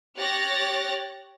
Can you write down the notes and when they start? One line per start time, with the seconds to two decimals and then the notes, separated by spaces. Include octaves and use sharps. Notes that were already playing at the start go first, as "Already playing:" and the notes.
0.18 G4 C#5 F6 F#6 A6 A#6